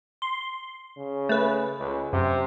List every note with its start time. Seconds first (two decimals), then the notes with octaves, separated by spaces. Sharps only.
0.22 C6
0.97 C#3
1.29 A3 B4
1.79 C#2
2.13 F#2 C3